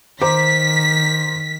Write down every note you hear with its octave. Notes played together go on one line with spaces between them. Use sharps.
D#3 C5 A#5 D6 B6